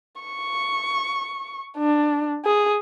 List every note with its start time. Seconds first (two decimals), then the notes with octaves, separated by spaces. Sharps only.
0.21 C#6
1.77 D4
2.45 G#4